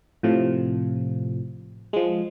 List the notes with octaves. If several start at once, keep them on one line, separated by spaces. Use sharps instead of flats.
A2 C3 F3
F3 G#3